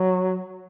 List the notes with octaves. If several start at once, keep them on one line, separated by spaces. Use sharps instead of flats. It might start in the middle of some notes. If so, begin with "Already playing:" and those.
Already playing: F#3